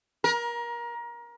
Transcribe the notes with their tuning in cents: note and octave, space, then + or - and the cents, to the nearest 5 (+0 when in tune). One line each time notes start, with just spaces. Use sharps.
A#4 +25